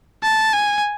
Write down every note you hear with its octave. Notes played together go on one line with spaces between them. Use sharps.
A5
G#5